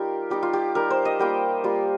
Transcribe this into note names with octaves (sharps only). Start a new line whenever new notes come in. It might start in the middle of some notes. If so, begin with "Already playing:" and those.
Already playing: G3 D#4 F4 G4 A#4
G3 D#4 G4
F4
G4
G3 D#4 A#4
C5
D#5
G3 A#3 F4 G5
G3 A#3 F4